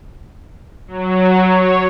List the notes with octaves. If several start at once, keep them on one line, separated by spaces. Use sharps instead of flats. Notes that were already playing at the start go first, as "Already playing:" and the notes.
F#3
C#5